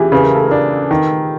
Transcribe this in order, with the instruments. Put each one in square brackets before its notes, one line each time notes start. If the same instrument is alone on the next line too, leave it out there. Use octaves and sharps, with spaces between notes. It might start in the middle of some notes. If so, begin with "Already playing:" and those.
Already playing: [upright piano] E3 [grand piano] F4 G4 G#4
[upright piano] C#3 [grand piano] B4
[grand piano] A#4
A4
A#4
[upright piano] D4
D#3